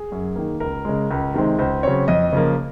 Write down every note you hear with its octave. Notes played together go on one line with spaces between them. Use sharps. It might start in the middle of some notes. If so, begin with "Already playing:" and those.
Already playing: G#4
F#2
D#3 A#3
C#2 A#4
C#3 G#3
C#2
C3 D#3 G#3 C4
C#2 C5
C#3 F#3 C4 C#5
F2 D#5
C#3 F3 A#3